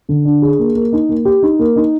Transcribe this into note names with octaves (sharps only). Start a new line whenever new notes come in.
D3
D4
G#4
A#3
A#3
D#4
A#3
G4
D#4
A#3
D#4